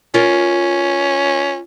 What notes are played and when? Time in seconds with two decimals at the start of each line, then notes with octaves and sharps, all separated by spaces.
0.14 C#4 F4 A#4